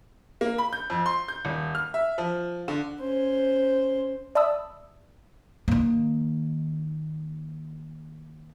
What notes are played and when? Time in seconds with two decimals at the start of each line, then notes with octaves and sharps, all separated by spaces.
0.41 A#3
0.58 B5
0.73 G6
0.90 F2
1.06 C6
1.28 G6
1.45 D#1
1.75 F6
1.94 E5
2.18 F3
2.68 D3
3.00 C#4 C5
4.35 D5 E5 A5 B5 D#6 E6
5.68 D#3 A#3